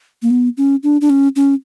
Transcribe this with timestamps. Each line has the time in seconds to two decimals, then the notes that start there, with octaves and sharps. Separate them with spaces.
0.23 A#3
0.30 B3
0.57 C#4
0.83 D4
1.01 D4
1.10 C#4
1.36 C#4